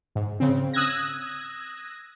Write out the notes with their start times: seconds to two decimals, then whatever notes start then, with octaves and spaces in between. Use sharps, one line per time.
0.15 G#2
0.40 C#3 C4
0.74 D#6 E6 F#6 G#6 A#6